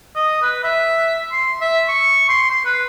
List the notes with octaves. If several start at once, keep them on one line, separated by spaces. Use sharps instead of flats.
D#5
B4
E5
C6
E5
C#6
C6
C6
B4